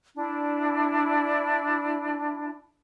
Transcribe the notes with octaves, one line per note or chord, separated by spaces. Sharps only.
D4 E4